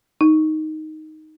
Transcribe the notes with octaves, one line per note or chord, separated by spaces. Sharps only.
D#4